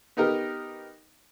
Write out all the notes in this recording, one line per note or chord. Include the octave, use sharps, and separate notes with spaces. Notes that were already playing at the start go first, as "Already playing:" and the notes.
B3 D#4 G4 A#4